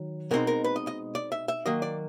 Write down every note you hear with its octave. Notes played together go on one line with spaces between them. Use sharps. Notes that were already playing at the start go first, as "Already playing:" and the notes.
Already playing: D#3 F#3
B2 G#3 C4 D#4 A#4
A#4
B4
D#5
D#5
D5
E5
E5
D#3 F#3 A#3 D#5
D5